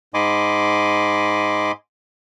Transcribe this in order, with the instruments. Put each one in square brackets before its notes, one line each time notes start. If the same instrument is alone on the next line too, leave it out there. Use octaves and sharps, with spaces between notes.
[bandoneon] G#2 D#5 G#5 B5 C6 D6